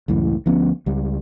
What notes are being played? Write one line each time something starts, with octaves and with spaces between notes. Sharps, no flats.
C#2 F#2 A2 E3
D2 F3 B3 C#4
C#2 G3